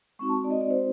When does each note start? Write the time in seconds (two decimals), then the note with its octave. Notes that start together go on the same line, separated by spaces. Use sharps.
0.19 G#3 C4 D#4 F#4 C#6
0.29 A5
0.44 D5
0.51 D#5
0.61 D5
0.70 C5